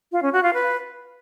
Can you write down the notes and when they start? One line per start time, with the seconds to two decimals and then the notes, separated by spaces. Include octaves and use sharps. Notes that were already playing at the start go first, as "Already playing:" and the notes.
0.12 F4
0.22 C#4
0.33 F#4
0.43 F4
0.54 B4